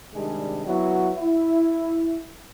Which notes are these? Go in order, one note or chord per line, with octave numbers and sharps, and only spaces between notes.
C3 D#3 G3 G#3 D4 G#4
F#3 B3 E4 F#4
E4